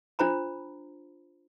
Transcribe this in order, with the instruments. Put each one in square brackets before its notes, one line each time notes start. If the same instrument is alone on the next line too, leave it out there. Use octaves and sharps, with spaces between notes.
[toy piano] D4 F4 C5 A#5 B5